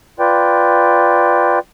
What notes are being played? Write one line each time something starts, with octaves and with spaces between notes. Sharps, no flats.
F4 B4 D5 G5